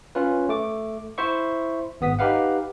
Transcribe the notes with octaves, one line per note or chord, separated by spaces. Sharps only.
C#4 F4 B4
A3 D6
E4 C5 E5 C#6
G#1 B3 D#6 B6
D#4 G4 B4 F5 F#5